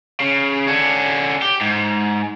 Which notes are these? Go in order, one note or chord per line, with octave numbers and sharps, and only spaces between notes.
C#3
D3 C#4
G4
G#2